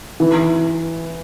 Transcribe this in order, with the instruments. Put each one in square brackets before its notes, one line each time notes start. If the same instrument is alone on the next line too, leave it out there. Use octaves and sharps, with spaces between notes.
[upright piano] E3